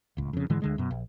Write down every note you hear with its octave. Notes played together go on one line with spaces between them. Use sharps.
D1 C#2
F2 C#3
G#2 D3 E3 G#3
D2 D3 G#3
F#2 B2
A#1